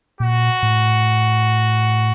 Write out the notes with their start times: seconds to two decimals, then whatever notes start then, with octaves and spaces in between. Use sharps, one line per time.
0.20 A#2 F#4
0.63 A2